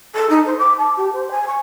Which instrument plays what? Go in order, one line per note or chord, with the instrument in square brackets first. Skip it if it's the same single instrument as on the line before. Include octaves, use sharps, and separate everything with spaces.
[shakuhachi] A4
D#4
C5
D6
A5
G4
C5
G#5
C#6